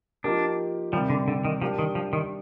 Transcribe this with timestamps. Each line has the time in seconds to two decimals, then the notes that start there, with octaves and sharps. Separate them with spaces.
0.24 F3 A#3 D4 D#4 G4 A#4
0.92 C3 D#3 F3 G3
1.10 D3
1.28 D3
1.45 D#3
1.61 F3 G3 D4 G4 A#4
1.79 D#3
1.95 F3
2.13 D#3